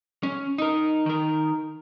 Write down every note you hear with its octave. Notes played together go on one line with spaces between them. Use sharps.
C#4
D#4 A#4
D#3 A#4